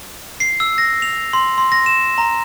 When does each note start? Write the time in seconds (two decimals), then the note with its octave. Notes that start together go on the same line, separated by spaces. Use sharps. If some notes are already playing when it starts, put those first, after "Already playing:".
0.40 C7
0.60 E6
0.78 A#6
1.02 F7
1.33 C6
1.58 C6
1.72 A#6
1.86 E7
2.18 A#5